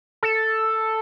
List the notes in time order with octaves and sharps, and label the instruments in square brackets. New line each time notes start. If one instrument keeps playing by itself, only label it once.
[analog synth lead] A4